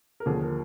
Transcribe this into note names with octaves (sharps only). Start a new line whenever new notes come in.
A#4
D#2 D3 F3 G#4
A#4